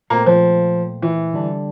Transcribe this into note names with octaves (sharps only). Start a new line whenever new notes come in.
A#2 A3 A#3 C4 F4
F3
E3
D3 G3 D4